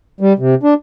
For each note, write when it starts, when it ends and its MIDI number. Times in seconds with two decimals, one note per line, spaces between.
0.21 0.33 55
0.39 0.55 48
0.63 0.74 62